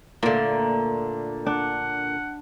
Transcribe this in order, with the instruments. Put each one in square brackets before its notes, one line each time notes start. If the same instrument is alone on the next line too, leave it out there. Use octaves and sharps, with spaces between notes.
[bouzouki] A#2 D3 [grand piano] A3 F4 [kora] A#3
[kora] D4 [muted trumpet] F#5